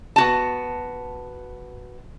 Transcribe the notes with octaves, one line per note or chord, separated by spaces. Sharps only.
B3 F#4 A5